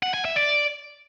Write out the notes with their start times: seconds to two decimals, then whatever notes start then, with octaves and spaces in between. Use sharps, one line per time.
0.03 F#5
0.14 G#5
0.25 E5
0.36 D5